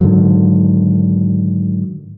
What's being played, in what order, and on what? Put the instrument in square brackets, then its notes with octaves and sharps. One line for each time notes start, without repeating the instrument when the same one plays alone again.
[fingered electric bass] G#2 D3 D#3 F#3